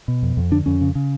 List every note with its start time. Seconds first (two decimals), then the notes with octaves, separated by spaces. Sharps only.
0.08 B2
0.22 F2
0.37 F2
0.51 D3 D4
0.66 F2 C#4
0.81 C#3
0.95 C#3